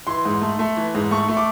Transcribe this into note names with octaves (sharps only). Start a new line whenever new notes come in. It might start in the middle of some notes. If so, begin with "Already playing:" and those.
E3 C6
G#2
A3
A3
E3
G#2
A3 C#6
A3
D6